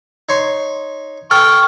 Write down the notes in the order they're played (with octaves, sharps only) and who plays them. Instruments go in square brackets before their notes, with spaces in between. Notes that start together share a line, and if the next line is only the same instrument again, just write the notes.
[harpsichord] D#4 C#5 C6
[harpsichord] A4 [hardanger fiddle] G5 [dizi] C#6 [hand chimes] F6